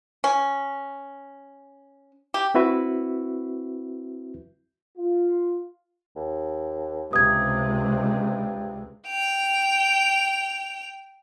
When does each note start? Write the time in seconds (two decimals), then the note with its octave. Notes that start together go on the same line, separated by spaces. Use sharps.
0.24 C#4
2.34 G4
2.55 C4 E4 F#4 B4 E5
4.98 F4
6.16 D#2
7.13 C#2 G2 C3 G#3 D#6 G#6
9.06 G5 F7